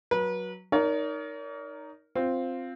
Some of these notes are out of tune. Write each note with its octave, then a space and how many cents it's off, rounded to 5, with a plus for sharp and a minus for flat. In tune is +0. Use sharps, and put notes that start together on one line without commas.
F#3 +0 B4 -30
D#4 -5 A#4 +0 C#5 +45
C4 +0 F4 +0